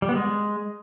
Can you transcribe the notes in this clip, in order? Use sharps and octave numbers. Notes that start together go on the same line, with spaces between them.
G3
B3
G#3